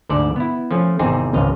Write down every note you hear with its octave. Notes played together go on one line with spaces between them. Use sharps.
D2 G#2 A4 D5
B3 E4
F3 A3 C#4
G#1 E2 C3 C4 D#4 G#4
G#1 C#2 D#5 F5